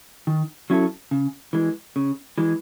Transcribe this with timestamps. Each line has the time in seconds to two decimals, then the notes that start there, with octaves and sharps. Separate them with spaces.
0.27 D#3
0.70 F#3 C#4 E4 A4
1.11 C#3
1.53 E3 G#3
1.96 C#3
2.38 E3 G#3